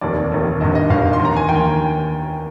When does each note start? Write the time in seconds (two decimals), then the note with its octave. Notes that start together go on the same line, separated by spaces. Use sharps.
0.01 F1 D#2 D#3 D5
0.32 F1 D#2 D#3
0.60 G1 G2 D#3 D#5
0.75 D#5
0.90 G1 G2 D#3 F5
1.13 C6
1.20 D#2 D#3
1.25 A#5
1.36 G#5
1.49 D#2 D#3 G5